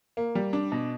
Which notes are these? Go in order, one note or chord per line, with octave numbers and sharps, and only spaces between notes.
A#3
G3
D4
B2